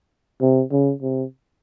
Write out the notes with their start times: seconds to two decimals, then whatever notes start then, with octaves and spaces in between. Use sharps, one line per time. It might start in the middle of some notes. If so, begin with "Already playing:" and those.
0.41 C3
0.72 C#3
1.02 C3